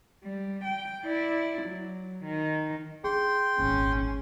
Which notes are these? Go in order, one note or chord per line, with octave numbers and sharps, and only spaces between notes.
G3
G5
E4 D5
F#3
D#3
D4 G#4 G5 C6
D#1 G#1 C#4